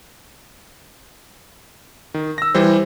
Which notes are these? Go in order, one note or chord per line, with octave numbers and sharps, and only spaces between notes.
D#3
E6 A#6
E3 G3 C5